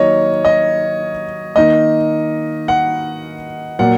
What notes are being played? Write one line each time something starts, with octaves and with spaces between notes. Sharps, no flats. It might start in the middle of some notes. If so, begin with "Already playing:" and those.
Already playing: D#3 F#3 A#3 C#5 D#5
D#5
D#3 A#3 D#5
F#5
A#2 F#3 A#3 F#5